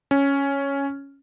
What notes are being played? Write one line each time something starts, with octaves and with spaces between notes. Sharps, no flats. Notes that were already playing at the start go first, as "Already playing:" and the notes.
C#4